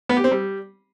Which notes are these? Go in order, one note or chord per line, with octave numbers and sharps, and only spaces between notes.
B3
G4
C4
G3